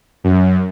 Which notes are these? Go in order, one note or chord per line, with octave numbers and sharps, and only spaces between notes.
F#2